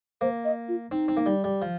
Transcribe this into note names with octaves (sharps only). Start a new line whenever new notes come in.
A#3 C5
D#5
F4
C4 D#4
C4
A#3
G3
G3
F3